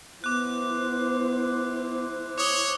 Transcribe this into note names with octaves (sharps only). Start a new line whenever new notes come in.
B3 E4 C5 D6 F#6
C#5 D6 D#6 G7